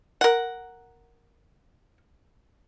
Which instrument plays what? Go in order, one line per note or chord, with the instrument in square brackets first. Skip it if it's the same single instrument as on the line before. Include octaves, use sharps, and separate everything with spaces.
[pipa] A#4 F#5